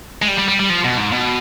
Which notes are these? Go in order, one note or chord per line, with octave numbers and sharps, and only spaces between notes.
G#3
G3
G3
G3
G3
F3
B2
G#2
B2